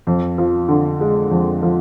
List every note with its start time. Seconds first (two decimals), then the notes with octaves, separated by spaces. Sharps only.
0.07 F2
0.38 F3
0.69 D3
1.01 G#3
1.31 F2
1.63 F3